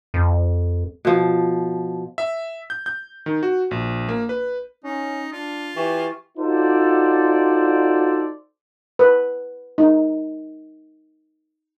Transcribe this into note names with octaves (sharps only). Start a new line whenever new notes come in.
F2
B2 F3
E5
G6
G6
D#3
F#4
A#1
A#3
B4
C#4 D#4
D4 F4
E3 G4 C#6
D#4 F4 F#4 A4 C5 D5
B4
D#4